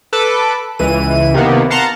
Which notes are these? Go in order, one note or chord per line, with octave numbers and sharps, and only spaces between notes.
A4 B4 D6
C#2 E3 D#7
C3 D#3 A#3 B3
F5 F#5 A5 A#5 C6